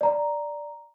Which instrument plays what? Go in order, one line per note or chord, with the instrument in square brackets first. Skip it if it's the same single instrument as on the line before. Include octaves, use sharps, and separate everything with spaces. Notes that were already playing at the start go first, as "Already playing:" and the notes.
[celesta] D5 A#5